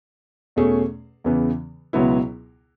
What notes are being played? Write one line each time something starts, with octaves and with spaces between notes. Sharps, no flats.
E2 B2 A3 C#4 G#4
E2 C#3 E3 B3
C#2 B2 F#3 B3 E4